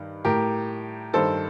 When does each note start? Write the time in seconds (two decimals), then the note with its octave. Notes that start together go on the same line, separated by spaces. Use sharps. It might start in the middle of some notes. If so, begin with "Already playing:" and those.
Already playing: G2 D#3
0.25 A2 G4 A#4
1.14 G2 D#3 A4 C5